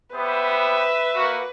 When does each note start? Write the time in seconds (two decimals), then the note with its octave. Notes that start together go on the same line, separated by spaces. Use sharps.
0.14 B3 G4 B4 C5 E5
1.16 A#3 F#4